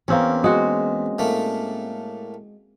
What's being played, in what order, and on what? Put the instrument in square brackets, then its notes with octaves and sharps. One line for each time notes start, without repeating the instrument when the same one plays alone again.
[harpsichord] E2 [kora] A#3 C4 C#4
[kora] G#3 F#4
[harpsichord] A2 A3 A#3